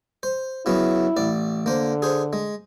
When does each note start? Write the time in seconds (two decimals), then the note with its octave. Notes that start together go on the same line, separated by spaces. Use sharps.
0.23 C5
0.66 C#3 F#3 B3 E4
1.17 A1 D5
1.66 D3 A#3 C5
2.02 G#4 C5
2.33 G#3